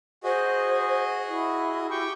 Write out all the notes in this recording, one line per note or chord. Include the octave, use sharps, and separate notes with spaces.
F#4 G#4 C5 D#5
E4
G4 G5 C#6